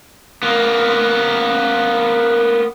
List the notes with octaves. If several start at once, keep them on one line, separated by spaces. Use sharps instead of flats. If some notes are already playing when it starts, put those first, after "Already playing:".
A#3 B3